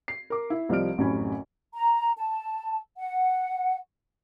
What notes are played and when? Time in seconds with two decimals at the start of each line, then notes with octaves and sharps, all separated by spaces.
0.08 C7
0.30 A#4 D6
0.50 E4
0.69 C2 F3 G3 D#5 F6 D7
0.98 A1 F#2 C3 C#4 G#5 B5
1.73 A#5
2.18 A5
2.98 F#5